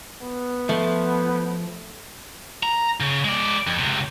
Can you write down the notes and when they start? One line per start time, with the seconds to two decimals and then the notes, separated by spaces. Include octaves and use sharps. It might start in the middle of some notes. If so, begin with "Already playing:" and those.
0.22 B3
0.69 F3 A3
2.63 A#5
3.00 C#3
3.24 G#3 D5
3.67 F2
3.79 C#2 C3